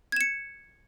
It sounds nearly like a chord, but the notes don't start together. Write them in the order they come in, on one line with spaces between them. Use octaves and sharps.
G#6 E7 C#7